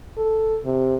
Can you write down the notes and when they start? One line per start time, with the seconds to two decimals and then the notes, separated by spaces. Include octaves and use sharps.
0.18 A4
0.65 C3